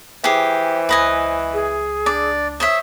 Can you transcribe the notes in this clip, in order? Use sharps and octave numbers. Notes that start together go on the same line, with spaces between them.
E3 G4 G#4 C5
C#2 B4 D#5 G#5
G#4
D4 D5
C5 C#5 E5 D#6